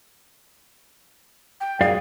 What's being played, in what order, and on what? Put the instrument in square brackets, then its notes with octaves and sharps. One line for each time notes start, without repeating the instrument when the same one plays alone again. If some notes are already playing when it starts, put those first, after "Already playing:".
[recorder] G5
[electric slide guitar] F#2 D5 F5 [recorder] G#4